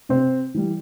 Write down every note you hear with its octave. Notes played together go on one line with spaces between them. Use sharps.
C3 C4
E3 G3